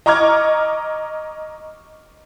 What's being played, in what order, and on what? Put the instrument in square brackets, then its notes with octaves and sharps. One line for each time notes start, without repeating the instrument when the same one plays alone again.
[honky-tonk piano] D#5 A#5 C#6 D6 F6 G#6